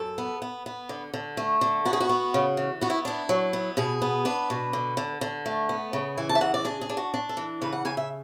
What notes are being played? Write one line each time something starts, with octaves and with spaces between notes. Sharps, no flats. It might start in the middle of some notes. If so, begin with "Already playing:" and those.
Already playing: F#2 A4
B3
B3
B3
D3
D3
A3
D3
B3 F#4
G#4
F#4
B3
C#3
E3
B3 F#4
E4
D4 E4
F#3
B3
B2 G#4
B3
D4 B4
B2
D3
D3
D3
A3
B3
C#3
E3 G#5
A5
E5
C#3 F#5
D5
D4 G#4
G#4
D4
F#4
D4
A4
E3
C#3 B4
F#5
C#3 G#5
E5